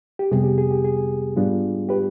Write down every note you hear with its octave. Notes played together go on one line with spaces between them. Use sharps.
G4
F2 C3 G3 B3 G#4
G4
G#4
G4
G#4
G#2 G3 B3 D4 F4
G4 B4